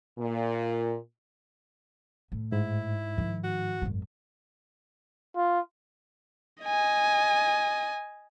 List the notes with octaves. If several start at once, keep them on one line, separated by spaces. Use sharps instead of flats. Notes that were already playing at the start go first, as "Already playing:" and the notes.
A#2
A2
G#2 E4
D#3 F3
F#4
G#1 F#2
F4
D#5 G#5